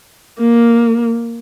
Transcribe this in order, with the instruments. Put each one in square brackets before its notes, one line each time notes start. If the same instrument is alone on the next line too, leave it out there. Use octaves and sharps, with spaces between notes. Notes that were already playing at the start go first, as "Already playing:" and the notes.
[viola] A#3